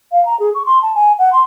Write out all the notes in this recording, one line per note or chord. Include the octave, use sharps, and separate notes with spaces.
F5
A#5
G#4
C#6
C6
A5
G#5
F#5
C6